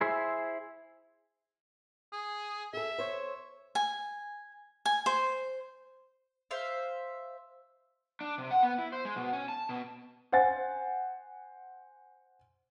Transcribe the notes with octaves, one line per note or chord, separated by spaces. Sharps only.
E4 G#4 C5 E5
G#4
G#4 A4 E5
C5 C#5
G#5
G#5
C5
C5 E5 F5
D4
C3
F#5
B3
E4
C5
G#3
B2
C#4
A5
B2
C5 F#5 G#5 A6